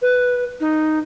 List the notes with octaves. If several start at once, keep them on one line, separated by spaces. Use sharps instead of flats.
B4
D#4